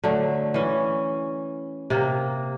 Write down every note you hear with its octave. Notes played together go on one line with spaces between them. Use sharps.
D3 F#3 A3
E3 C#4
C3 A#3